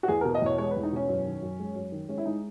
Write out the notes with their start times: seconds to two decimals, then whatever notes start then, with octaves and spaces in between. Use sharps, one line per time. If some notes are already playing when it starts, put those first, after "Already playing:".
0.03 F#4
0.08 E2 G#4
0.21 A#4
0.25 B2
0.35 D#5
0.42 E2 C#5
0.58 G#3 C#5
0.71 B4
0.76 E2
0.83 D#4
0.92 B2 C#4
1.09 F#2
1.26 D#3
1.42 F#2
1.59 G#3
1.75 F#2
1.92 D#3
2.09 G#3 C#4
2.18 E4
2.26 G#3 D#4